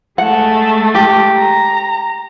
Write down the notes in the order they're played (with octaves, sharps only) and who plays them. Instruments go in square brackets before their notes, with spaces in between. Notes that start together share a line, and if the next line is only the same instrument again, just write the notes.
[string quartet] G#3 A3 [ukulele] F#5
[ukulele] G4
[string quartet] A#5